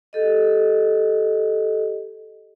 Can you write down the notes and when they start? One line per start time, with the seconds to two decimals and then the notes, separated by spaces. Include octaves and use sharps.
0.13 G4 A4 D#5